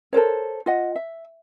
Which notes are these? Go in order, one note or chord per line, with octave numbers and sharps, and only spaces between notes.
A4 A#4 C5 C#5
F4 D#5 F#5
E5